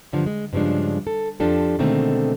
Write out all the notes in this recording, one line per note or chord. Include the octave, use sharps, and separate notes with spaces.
G2 D3 F3
G#3
G2 C#3 F3 G#3 D4
A4
F2 F3 D4 G4 A4
B2 D3 D#3 G#3 A3 C4